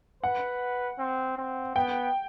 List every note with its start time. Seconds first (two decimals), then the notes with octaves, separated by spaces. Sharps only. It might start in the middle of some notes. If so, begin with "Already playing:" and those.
0.23 B4 F#5
0.99 C4
1.37 C4
1.75 B3 G5